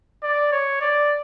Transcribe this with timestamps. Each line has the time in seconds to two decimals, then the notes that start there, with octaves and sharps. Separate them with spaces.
0.23 D5
0.52 C#5
0.81 D5